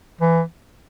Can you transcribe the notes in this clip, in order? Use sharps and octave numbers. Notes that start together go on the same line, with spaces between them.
E3